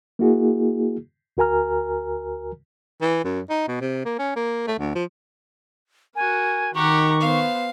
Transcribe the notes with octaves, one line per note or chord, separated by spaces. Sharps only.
A#3 E4 F#4 G#4
D2 F#4 A#4 G#5 A#5 F6
E3
F#2
D#4
B2
C3
A#3
C#4
A#3
A3
D2
F3
F#4 A#4 G#5
D#3 G4 F#5 A#5 C#6
B3 C5 F5